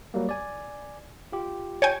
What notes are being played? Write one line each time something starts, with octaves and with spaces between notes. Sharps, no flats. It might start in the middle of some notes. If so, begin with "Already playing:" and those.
F#3 G3 A#3
D5 G#5
F4 G4
C#5 G5 G#5